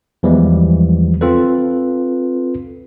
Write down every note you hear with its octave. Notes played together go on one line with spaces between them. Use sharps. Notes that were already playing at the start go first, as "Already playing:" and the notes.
E2 E3 F3 G3 G#3
C4 F4 A4 B4